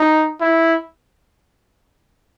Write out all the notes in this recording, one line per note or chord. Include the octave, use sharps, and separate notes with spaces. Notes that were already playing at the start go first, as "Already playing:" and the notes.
Already playing: D#4
E4